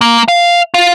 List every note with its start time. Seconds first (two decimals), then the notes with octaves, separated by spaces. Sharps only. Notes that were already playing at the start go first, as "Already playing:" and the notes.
0.01 A#3
0.28 F5
0.74 F4